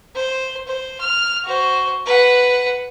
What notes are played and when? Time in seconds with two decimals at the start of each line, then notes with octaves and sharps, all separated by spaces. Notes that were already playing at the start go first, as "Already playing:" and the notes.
0.15 C5
0.68 C5
1.01 F6
1.44 F#4 C5
2.06 B4 F#5